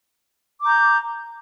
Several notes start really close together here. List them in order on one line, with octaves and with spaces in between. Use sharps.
D6 A#5 G6